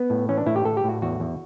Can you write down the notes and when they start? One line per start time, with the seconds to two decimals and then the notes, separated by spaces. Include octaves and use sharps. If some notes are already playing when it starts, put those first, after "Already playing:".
Already playing: B3
0.10 A2
0.29 E3 C#4
0.38 D4
0.46 A2 E4
0.56 G4
0.65 A2 A4
0.77 G4
0.84 A2
0.89 F#4
1.02 E2 F#4
1.20 E2